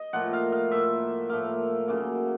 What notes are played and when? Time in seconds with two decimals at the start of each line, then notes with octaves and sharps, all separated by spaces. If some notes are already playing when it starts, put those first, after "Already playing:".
Already playing: D#5
0.13 A2 F3 A#3 F#5
0.33 F5
0.52 F5
0.71 A2 F3 A#3 E5
1.29 A2 F3 A#3 F5
1.88 C#3 F#3 A#3